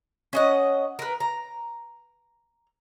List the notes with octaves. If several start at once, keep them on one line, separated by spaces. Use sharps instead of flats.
C#4 D#5 F#5
A#4 B4
A#5